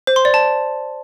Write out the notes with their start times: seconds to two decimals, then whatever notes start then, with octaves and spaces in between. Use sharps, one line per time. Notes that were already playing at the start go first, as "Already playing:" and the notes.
0.07 C5
0.16 C6
0.25 D5
0.34 A5